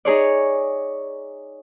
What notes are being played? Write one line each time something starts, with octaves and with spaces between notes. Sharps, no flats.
D#4 G#4 C#5 D5